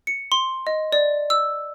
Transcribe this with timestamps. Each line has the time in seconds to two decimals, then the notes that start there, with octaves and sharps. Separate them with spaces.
0.07 C#7
0.32 C6
0.67 D#5
0.92 D5
1.30 E6